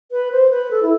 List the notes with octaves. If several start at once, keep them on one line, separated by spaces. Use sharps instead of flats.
B4
C5
B4
A4
E4